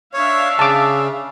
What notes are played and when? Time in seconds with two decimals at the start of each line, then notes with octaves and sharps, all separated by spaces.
0.14 D4 C#5 E5 F5
0.59 C#3 A5 D6